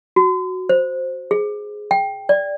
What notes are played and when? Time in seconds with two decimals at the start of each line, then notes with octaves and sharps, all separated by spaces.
0.16 F#4
0.69 C5
1.31 G#4
1.91 G5
2.29 D5